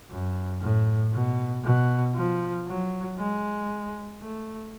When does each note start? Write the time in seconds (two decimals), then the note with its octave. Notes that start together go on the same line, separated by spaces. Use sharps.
0.10 F#2
0.61 A2
1.13 B2
1.64 B2
2.15 F3
2.67 F#3
3.18 G#3
4.21 A3